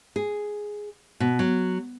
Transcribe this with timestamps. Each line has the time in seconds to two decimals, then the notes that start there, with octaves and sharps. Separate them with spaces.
0.16 G#4
1.20 B2
1.39 F#3